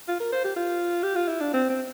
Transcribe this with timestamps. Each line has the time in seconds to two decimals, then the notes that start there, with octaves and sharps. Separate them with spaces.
0.08 F4
0.20 A#4
0.32 C5
0.44 G4
0.56 F4
1.03 G4
1.16 F4
1.28 E4
1.41 D4
1.54 C4
1.70 C4